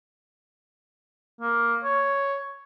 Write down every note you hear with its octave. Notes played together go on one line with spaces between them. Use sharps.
A#3
C#5